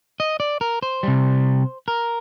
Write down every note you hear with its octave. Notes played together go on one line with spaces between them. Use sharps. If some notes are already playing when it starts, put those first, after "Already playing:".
D#5
D5
A#4
C5
C3 G3
A#4